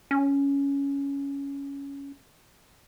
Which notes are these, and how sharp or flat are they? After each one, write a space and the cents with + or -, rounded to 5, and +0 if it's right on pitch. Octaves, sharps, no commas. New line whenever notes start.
C#4 +10